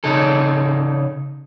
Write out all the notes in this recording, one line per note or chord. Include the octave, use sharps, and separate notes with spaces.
C#3 D#4 G#4 A4